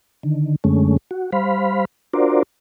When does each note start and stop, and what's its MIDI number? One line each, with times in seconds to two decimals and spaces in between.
0.23 0.56 50
0.23 0.56 51
0.64 0.97 42
0.64 0.97 50
0.64 0.97 56
0.64 0.97 57
0.64 0.97 61
1.11 1.31 66
1.32 1.85 55
1.32 1.85 72
1.32 1.85 77
1.32 1.85 83
2.14 2.43 62
2.14 2.43 65
2.14 2.43 66
2.14 2.43 70
2.14 2.43 72
2.14 2.43 74